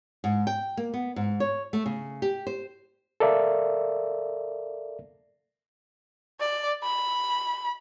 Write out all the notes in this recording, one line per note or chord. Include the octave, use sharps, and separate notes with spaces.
G#2
G5
A#3
B3
G#2
C#5
A3
C#3
G4
C5
A4 A#4 D5 E5 F5
D5
B5